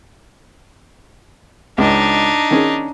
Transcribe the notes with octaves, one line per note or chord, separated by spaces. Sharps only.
C#2 D4 D#4
D#3 C#4 G#4